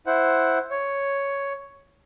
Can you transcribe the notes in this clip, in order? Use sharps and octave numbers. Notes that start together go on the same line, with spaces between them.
E4 C5 F#5
C#5